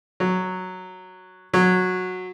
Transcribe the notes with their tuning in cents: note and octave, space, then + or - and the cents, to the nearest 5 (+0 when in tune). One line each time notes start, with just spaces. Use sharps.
F#3 +0
F#3 -10